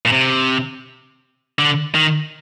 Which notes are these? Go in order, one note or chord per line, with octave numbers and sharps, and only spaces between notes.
A#2
C3
D3
D#3